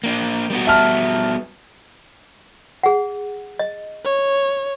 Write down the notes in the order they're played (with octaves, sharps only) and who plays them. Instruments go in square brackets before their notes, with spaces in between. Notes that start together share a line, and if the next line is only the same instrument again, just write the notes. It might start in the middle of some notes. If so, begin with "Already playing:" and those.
[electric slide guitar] A#3 D4
G3 B3 F#4
[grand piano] E5 A5 F6
[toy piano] G#4 F#5
D#5
[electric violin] C#5